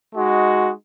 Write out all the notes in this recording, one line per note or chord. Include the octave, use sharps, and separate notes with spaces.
G#3 D#4 F#4